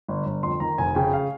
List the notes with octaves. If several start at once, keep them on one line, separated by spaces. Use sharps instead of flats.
G1
G1
F2 C6
D#3 A#5
F1 G#5
C#3 G5
F5